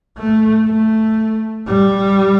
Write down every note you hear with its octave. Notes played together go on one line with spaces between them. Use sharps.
A3
A3
G3